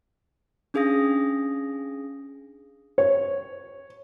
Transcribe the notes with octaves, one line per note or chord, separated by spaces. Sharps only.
C#4 D4 G#4 F5 D#6 A#6
C#5